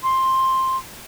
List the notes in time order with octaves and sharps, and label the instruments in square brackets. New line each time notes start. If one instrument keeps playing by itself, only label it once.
[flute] C6